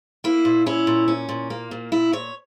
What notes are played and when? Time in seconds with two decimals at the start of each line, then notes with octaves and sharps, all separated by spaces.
0.24 A#3 E4
0.45 A#2
0.66 C#4 E4
0.87 A#2
1.08 C#4
1.29 A#2
1.50 A#3
1.71 A#2
1.92 A#2 E4
2.12 A#2 C#5